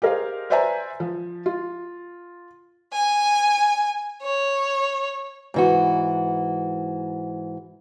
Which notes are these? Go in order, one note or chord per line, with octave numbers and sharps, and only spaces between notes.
G4 G#4 A#4 C5 D#5 F5
B4 C5 D5 E5 G#5 A#5
F3
F4
G#5
C#5
G#2 E3 F#4